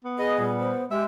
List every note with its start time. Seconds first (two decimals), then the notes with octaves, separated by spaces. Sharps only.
0.05 B3
0.18 G#4 B4 D#5
0.39 A#2 G3
0.60 C5
0.91 G#3 G4 E5